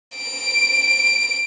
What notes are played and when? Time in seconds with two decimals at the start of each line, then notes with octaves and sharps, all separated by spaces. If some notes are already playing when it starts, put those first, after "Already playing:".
0.16 D7